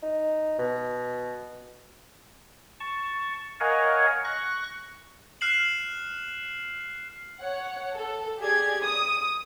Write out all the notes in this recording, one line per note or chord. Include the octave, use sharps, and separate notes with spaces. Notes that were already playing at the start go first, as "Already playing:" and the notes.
D#4
B2
A5 C#6
A#4 C#5 D#5 F5 F#5 G#5
C#6 F#6 A#6
F6 F#6 C7 E7 F#7
C#5 F#5
A4
G4 G#4 D5 G#6
D#6